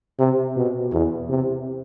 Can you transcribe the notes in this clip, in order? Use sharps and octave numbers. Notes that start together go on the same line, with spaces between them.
C3
B2
E2
C3